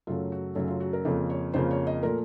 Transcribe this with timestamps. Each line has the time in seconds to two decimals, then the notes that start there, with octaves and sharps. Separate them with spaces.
0.07 F#2 C#3 F#3 A3 F4
0.32 F#4
0.55 F#2 C#3 F#3 A3 C#4
0.68 F4
0.80 F#4
0.93 A#4
1.05 F2 C#3 F3 A#3 A4
1.30 C#5
1.54 F2 C#3 F3 A#3 C5
1.71 C#5
1.87 D#5
2.03 A#2 F3 A3 A#4